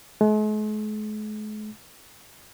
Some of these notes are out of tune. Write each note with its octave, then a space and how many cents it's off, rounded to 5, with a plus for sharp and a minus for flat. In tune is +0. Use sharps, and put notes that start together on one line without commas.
G#3 +45